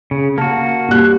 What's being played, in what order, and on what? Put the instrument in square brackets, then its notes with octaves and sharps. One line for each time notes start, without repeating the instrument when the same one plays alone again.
[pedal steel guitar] C#3
[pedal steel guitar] A#3 F#4 [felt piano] A5
[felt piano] A#2 G3 F#6